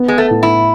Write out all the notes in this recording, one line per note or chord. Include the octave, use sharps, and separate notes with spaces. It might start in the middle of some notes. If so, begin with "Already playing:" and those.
Already playing: B3
G#3
A3
A2
E4